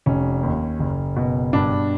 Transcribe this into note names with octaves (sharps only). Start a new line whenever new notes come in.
F1 C#4
D#2
F#1
B2
G2 D4